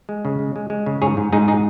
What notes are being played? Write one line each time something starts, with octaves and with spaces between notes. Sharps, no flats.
G#3
C#3
G#3
G#3
G#3
C#3
G#2 G#4 C#5
G#2
G#2 D#4 G#4
G#3 D#4 G#4